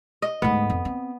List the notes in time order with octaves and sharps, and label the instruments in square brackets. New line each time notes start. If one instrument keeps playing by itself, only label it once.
[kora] D#5
[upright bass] D2 G#2 [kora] B3
[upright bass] F2
C4